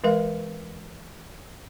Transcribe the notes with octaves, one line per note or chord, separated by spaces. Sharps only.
E3 G#3 A#4 F5